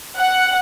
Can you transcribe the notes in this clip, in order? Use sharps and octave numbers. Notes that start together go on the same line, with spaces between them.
F#5